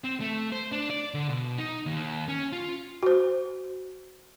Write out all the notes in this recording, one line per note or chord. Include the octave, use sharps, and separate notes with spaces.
C4
A3
C5
D4
D5
D3
B2
D#4
D#2
C#4
F4
F#4 C5